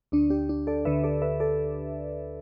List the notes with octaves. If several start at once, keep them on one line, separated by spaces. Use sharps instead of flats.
D2 D3 D4
D4 G4
D4
A4 D5
D2 D3 B4 E5
A4 D5
B4 E5
A4 D5